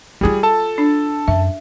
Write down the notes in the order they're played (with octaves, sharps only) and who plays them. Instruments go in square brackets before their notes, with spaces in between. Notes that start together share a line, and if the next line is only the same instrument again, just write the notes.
[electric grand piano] G3 G#4 [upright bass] D#4 F4
[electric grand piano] A4 A5
[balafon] D4
[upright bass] F#2 [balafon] E5